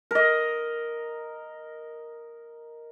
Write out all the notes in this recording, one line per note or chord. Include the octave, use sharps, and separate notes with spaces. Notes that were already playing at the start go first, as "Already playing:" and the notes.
A#4 D#5